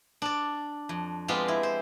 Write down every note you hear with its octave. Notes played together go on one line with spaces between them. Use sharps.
D4 D5
F2
G#3 B3 C4 F4 G4
E4
C5